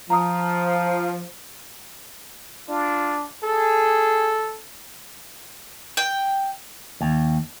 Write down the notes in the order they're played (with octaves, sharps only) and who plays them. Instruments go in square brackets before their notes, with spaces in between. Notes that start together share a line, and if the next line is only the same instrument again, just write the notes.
[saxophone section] F3 [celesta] A#5 D#6
[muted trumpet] D4 [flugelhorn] F4
[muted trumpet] G#4 [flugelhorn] A4
[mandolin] G5
[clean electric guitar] D#2